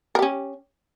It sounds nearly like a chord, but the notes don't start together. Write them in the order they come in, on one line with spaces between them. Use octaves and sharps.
A#4 G4 C#4